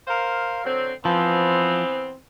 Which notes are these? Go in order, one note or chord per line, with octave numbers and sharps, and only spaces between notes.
A#4 C5 F5
D3 F#3 C4
E3 F3 B3 C4